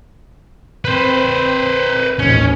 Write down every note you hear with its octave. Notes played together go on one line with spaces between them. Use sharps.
C4 B4 C5
A1 D#2 G#2 C#4